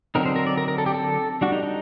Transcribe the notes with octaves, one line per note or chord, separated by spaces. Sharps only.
D3 F#3 C4 D#4 A#4
C5
A#4
D5
A#4
A#4
A4
G4
A4
G3 D4 F#4
D#4
D#4